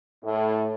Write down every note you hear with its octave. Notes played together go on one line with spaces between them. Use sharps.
A2